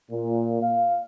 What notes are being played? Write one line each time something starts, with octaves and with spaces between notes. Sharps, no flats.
A#2
F5